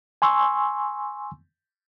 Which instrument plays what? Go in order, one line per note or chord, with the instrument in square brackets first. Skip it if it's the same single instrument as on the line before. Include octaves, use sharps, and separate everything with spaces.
[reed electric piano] G#5 C6 C#6 E6